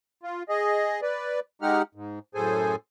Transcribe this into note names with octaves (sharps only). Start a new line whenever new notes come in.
F4
G#4 D#5
B4 D5
G#3 D#4 G4 F#5 F6
G#2
F#2 A2 G#4 A4 C5 G#5